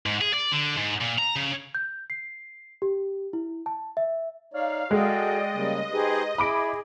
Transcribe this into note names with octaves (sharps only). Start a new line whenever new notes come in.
G#2
G#4
D5
D3
G#2
A#2
A#5
C#3
G6
C7
G4
E4
A5
E5
D#4 C#5 D5 F5
G#3 F#4 G#4 A4 D5 D#5 G5
C#3 G3 A#3
D#4 G4 G#4 B4 C5
E4 G#4 E5 B5 D6 D7